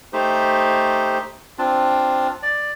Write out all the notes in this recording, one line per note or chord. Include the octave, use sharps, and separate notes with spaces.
A3 D#4 G4 C5
C4 D4 F4
D5